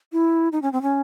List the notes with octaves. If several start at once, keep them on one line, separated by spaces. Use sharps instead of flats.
E4
D#4
C#4
C4
C#4